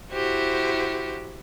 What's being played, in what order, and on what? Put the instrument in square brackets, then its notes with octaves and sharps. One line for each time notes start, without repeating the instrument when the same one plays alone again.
[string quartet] E4 F#4 G4 C5